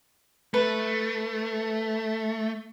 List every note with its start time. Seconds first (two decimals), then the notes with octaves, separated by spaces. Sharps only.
0.54 A3 B4